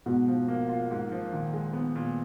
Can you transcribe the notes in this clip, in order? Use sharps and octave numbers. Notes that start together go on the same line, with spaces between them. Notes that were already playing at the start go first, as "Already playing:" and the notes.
G#2 B2
F3
A#3
F4
G#2
F3
A#2 D#3
G#3
B3
A#2